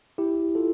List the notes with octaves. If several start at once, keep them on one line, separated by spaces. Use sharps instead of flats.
E4 G4
F4 A4